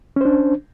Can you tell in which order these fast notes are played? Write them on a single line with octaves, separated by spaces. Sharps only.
C#4 C5 D4